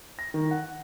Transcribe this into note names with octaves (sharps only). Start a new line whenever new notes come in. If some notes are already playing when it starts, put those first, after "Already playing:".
A#6
D#3
F#5